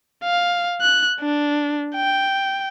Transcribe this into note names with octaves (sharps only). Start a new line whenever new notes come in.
F5
F#6
D4
G5